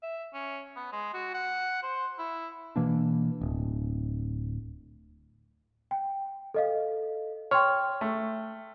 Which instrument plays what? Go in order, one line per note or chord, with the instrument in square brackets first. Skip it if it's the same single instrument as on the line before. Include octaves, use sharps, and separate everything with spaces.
[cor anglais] E5
C#4
B3
G#3
F#4
F#5
C5
E4
[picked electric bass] B2 E3 A#3 D4
D1
[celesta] G5
A4 D#5 F5
[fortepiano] C#5 [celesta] G5 C6 F6
[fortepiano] A3